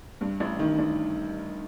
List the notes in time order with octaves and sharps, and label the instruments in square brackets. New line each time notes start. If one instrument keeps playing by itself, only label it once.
[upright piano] G2
A1
D#3
A1